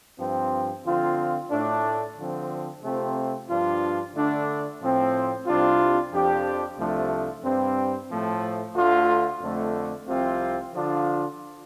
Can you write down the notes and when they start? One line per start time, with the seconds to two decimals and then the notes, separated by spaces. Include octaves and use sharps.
0.19 G2 F3 C4
0.85 D3 F3 C4 F4
1.51 A2 A3 D4
2.17 D3 F3 C4
2.83 C3 A3 C4 F4
3.49 G2 F3 D4 F4
4.14 D3 A3 D4
4.81 A2 F3 C4
5.46 C2 C3 G3 D4 F4
6.12 F2 F3 D4 G4
6.78 C2 C3 F3 A3 D4
7.44 G2 G3 C4
8.10 A2 F3 A3
8.75 D2 D3 A3 F4
9.41 F2 D3 A3
10.07 C2 C3 F3 C4 F4
10.74 D3 F3 D4 F4